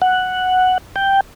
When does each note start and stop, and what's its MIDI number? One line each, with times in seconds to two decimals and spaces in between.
0.02 0.78 78
0.96 1.21 79